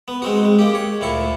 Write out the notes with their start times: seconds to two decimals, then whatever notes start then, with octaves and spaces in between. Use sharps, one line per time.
0.08 B3
0.22 G#3 C4 F#4
0.45 G#3
0.59 A#3 G4
0.75 C#5
1.01 D2 A#2 E4 C#6